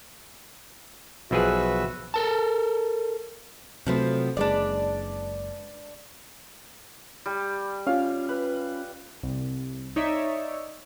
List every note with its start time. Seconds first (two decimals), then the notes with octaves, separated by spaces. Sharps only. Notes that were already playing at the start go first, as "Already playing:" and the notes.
1.31 B1 F3 F#4 G#4 B4 E5
2.14 A4 A#4 A5
3.87 C3 F3 F#3 A3 B3 C4
4.37 F#1 G#3 D4 B4 D5
7.26 G3
7.87 C#4 F4 F5
8.29 B4
9.23 C2
9.96 D#4 C#5 D5 E5